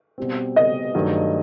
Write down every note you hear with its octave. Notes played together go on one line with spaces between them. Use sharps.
B2 G3 C4
D#5
G2 D#3 F#3 A3